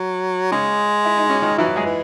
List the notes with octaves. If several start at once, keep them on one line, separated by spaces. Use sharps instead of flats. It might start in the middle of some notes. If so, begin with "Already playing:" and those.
Already playing: F#3
C#3 G#3 C#4
E4
D#4
C#4
D#3 D#4
E3 F#3 E4
G#3 G#4
E3